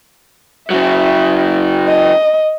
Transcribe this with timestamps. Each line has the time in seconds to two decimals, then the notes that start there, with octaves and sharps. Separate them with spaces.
0.70 C#3 F#3 E5
1.87 D#5